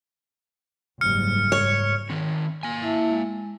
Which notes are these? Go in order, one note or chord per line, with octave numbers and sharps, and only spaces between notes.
F#1 G#2 G3 F6 C#7
G#2 C#5
D#3 C4
A#3 G#5
E4 E5 A5
G#3